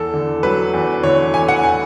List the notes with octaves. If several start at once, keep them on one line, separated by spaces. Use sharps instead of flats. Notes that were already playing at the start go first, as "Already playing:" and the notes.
Already playing: E2 A4
D3
F#3 B4
E2
D3 C#5
E2 G#5
F#5
G#5